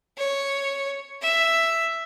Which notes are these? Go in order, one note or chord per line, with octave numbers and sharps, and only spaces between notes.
C#5
E5